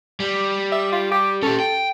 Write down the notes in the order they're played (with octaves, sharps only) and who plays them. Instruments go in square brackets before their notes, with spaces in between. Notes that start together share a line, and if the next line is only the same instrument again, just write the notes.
[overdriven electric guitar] G3
[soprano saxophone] E5
F4
G4
[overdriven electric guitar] C#4 G4 [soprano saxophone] A4
[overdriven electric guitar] G5